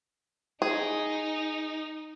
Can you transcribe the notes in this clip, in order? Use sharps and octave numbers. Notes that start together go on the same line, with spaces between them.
D#4 G#4